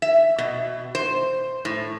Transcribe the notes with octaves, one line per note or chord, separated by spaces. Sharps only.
E5
B2
C5
A2